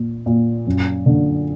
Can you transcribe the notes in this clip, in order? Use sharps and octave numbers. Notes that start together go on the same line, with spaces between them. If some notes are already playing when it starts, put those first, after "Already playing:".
Already playing: A#2
A#2
F#2
D3